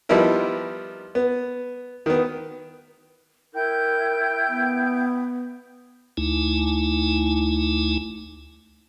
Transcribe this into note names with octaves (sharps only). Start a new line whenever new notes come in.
F3 G3 B3 D#4 E4 A#4
B3
D#3 B3
E4 A#4 G5 G6
B3
D2 A3 D#4 E4 G#5